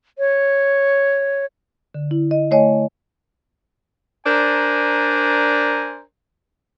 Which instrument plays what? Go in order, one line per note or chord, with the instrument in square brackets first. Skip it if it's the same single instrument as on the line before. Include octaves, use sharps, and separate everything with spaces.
[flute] C#5
[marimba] D3
E4
D#5
A3 C#5 D#5 G#5
[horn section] D4 A#4 C5 D5 G#5 A#5